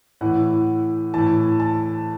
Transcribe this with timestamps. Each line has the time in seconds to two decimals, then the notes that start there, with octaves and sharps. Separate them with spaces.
0.21 A2 E3 F#5
1.14 A2 E3 A5
1.60 A5